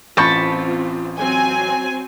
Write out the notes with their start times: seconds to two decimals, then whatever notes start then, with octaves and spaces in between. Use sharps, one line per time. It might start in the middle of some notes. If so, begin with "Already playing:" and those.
0.17 A1 C4 F4 A5 B5 C#6 G6
1.19 F#3 C4 G#5